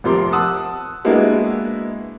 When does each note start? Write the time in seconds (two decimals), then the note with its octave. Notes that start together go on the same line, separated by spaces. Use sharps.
0.04 F1 C3 F3 A#4 C6 D6
0.32 F#5 A5 D#6 E6 F#6
1.05 G#3 A#3 B3 D4 E4 F#4